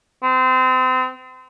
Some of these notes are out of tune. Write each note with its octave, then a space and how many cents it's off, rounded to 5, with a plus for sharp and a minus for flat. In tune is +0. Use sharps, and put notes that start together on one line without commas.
C4 -30